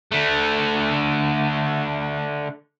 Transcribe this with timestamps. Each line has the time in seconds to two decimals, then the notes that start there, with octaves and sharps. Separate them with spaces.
0.12 D3 A3